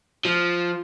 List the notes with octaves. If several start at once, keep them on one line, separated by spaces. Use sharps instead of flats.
F3